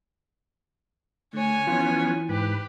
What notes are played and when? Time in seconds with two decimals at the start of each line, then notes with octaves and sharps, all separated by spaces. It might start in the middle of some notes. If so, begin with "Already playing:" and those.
1.34 D3 A3 C#5 G#5
1.67 E3 F3 B3 C#4 F4
2.29 G#2 G4 B4